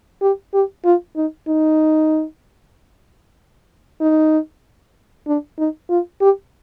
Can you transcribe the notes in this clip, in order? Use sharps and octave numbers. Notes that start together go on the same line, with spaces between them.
G4
G4
F4
D#4
D#4
D#4
D4
D#4
F4
G4